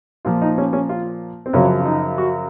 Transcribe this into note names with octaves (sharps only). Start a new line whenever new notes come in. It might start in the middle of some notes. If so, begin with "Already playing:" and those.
A#2 F3 F4
D#4
C#4
C#4
F4
C4
F#2 C#3 F3 C#4
F4
D#4
F#4